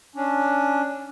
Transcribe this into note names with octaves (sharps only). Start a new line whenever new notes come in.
C#4 D4